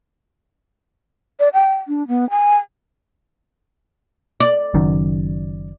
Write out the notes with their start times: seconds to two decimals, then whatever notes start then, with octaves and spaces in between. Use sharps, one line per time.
1.40 D5
1.54 G5
1.88 D4
2.08 B3
2.30 G#5
4.40 D5
4.74 F#1 F#2 D#3